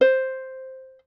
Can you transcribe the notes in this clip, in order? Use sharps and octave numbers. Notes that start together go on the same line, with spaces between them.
C5